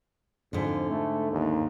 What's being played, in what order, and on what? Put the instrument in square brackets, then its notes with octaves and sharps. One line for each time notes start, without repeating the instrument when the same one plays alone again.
[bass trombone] F2 [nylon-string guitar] G#2 D3
[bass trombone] A3
D#2